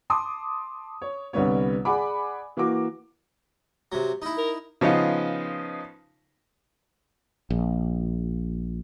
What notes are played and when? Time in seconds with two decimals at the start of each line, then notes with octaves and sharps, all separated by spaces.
0.10 A5 C6 D6 D#6
1.02 C#5
1.33 C2 D3 G3 B3 C#5
1.85 G#4 D5 F#5 G#5 B5 D6
2.57 E3 A#3 F#4 D6
3.92 C3 F#3
4.22 D#4 E4
4.38 A#4
4.81 C#3 F3 B3 D#4 F4
7.50 A#1